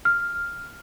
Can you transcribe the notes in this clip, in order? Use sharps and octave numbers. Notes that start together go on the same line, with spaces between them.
F6